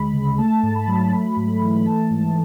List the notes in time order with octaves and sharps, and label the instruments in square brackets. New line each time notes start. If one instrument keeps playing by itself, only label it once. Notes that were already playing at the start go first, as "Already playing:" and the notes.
Already playing: [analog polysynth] D2 G#3 B5
C#3
A3 A5
G#2
B5
F#3
A3
G#2
E3
B5
A3 A5
G#2